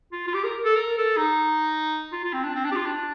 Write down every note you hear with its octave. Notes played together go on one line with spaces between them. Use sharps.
F4
F4
G4
A#4
A4
A#4
A4
D#4
F4
F4
C4
D4
C4
D4
G4
F4
D4